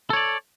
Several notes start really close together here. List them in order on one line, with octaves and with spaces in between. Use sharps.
A4 C#5 D5